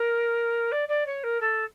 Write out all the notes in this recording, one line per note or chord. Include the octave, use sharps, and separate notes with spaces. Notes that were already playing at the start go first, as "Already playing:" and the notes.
Already playing: A#4
D5
D5
C#5
A#4
A4